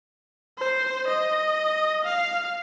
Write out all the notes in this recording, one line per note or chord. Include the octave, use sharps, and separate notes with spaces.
C5
D#5
F5